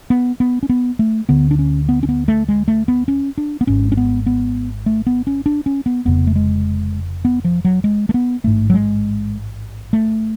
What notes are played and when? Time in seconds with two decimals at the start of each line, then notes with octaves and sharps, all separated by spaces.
0.10 B3
0.40 B3
0.63 C#4
0.69 B3
0.99 A3
1.29 D2 D3 B3
1.51 D4
1.59 C#4
1.89 B3
2.03 C#4
2.09 B3
2.28 A3
2.49 G#3
2.68 A3
2.88 B3
3.08 C#4
3.38 D4
3.61 B3
3.67 G#1 G#2 C#4
3.92 C#4
3.97 B3
4.26 B3
4.86 A3
5.07 B3
5.27 C#4
5.46 D4
5.66 C#4
5.86 B3
6.05 F1 F2 C#3 B3
6.27 A3
6.36 G#3
7.25 B3
7.44 F3
7.65 F#3
7.84 G#3
8.09 A3
8.14 B3
8.44 A1 G#2 A3
8.70 F#3
8.74 G#3
9.93 A3